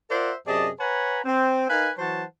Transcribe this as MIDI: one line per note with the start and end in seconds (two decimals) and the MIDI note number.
0.10 0.32 65
0.10 0.32 70
0.10 0.32 72
0.10 0.32 74
0.10 0.32 76
0.10 0.32 78
0.47 0.69 42
0.47 0.69 48
0.47 0.69 68
0.47 0.69 74
0.47 0.69 75
0.47 0.69 81
0.80 1.20 71
0.80 1.20 73
0.80 1.20 78
0.80 1.20 80
0.80 1.20 82
0.80 1.20 83
1.24 1.69 60
1.69 1.90 63
1.69 1.90 70
1.69 1.90 71
1.69 1.90 77
1.69 1.90 80
1.98 2.23 52
1.98 2.23 54
1.98 2.23 72
1.98 2.23 73
1.98 2.23 78
1.98 2.23 81